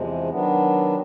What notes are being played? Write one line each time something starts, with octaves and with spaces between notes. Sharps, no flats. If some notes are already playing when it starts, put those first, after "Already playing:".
Already playing: E2 C3 F3 G#3
D#3 F#3 B3 D4